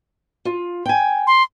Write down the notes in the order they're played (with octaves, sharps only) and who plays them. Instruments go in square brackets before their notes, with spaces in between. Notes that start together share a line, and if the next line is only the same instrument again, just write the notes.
[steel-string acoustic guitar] F4
G5 G#5
[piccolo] C6